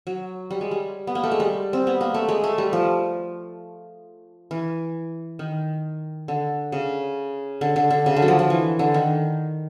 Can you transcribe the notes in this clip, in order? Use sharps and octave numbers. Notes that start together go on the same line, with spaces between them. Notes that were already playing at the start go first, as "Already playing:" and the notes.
F#3
G3
G#3
G3
B3
A#3
A3
G#3
G3
C4
B3
A#3
A3
G#3
A3
G3
F3
E3
D#3
D3
C#3
D3
D3
D3
C#3
D3
F#3
F3
F3
E3
D3
D#3